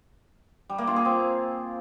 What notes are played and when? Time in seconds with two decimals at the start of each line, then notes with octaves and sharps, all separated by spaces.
0.69 G3
0.78 A#3
0.87 F4
0.96 G#4
1.05 C4